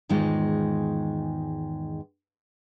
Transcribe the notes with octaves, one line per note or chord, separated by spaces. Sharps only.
E2 G#2 D#3 G#3 F4